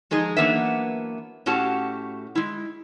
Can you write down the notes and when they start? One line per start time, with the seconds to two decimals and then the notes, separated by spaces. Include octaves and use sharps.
0.11 F3 G#3 D#4 G#4
0.37 E3 F#3 A#3 B3 D4 E5
1.46 A2 C#4 F#4 G4 A5
2.35 G#3 E4